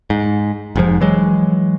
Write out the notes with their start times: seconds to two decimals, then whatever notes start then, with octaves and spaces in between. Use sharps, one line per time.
0.10 G#2
0.76 F1 G#2 F3
1.01 E3 F#3 G#3